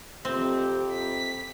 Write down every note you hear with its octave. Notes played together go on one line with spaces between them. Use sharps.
F2 C3 C4 G4
B6